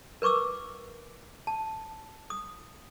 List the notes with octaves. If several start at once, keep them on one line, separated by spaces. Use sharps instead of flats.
A#4 B4 C#6 D6 E6
A5
D#6